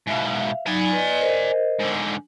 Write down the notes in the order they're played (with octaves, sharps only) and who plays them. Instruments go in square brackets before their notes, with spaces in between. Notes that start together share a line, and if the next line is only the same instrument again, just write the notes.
[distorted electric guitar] G#2 B2 [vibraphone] E5 F5
[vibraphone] F#3 D#4 B5 [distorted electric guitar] D5 G#5
[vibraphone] B4 D#5
A#4 C5 D#5
[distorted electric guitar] G#2 D3